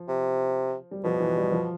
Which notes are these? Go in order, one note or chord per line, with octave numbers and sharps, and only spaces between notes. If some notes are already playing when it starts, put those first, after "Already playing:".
Already playing: F3
C3
G3
B2 F3
E3
G3
F3